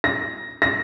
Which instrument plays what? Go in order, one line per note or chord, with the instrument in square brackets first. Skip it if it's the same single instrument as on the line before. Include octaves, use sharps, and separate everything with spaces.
[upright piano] A#6
A#6